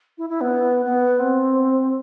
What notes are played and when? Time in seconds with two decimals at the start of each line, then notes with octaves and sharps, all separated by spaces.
0.18 E4
0.29 E4
0.41 B3
0.85 B3
1.19 C4